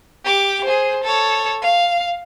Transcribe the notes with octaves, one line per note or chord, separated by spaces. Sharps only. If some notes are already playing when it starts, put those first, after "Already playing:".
G4 D6
G#4 C5
A4 C#5
F5